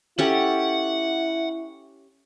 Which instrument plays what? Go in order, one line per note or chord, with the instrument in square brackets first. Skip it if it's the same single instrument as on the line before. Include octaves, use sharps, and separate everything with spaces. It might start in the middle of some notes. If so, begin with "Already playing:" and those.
[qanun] C#4 G4 A4 [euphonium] E4 [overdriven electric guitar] F#5